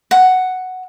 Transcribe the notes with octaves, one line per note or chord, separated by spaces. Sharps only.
F#5